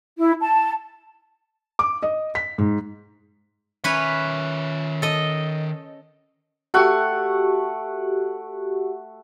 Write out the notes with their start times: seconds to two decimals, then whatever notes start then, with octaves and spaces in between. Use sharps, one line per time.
0.18 E4
0.41 A5
1.79 D6
2.03 D#5
2.35 B6
2.58 G#2
3.84 D#3 C#4 B4 C#5 E5
5.02 A4 D#5
6.74 A3 F#4 G4 F#5 C#6